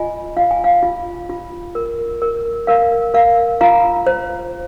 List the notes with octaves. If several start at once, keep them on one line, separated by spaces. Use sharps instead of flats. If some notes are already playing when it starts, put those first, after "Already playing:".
Already playing: F4 D#5 G#5
F4 F5
G#5
F5
F4
F4
A#4
A#4
A#4 F5
A#4 F5
F4 F5 A#5
C5